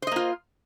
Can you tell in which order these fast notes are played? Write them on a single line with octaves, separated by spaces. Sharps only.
C5 D#5 A#3 F4